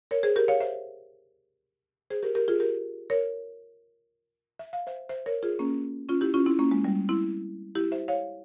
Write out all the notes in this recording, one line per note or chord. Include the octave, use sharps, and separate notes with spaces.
A#4 C#5
G#4 C5
G4 A#4
C#5 F5
C5 E5
G#4 C5
G4 A#4
G4 A#4
F4 G#4
G4 A#4
A#4 C#5
E5
F5
C5 E5
C5 E5
A#4 C#5
F4 G#4
A#3 C#4
C#4 F4
E4 G4
C#4 F4
C4 E4
A#3 C#4
G#3
G3
C4 E4
E4 G4
C5 E5
C#5 F5